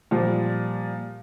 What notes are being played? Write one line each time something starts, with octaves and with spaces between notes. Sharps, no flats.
A#2 F3 G3